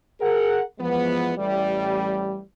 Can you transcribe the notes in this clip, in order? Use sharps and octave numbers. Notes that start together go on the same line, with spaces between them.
G#4 A#4 F#5
E2 F3 G#3 B3
A1 G3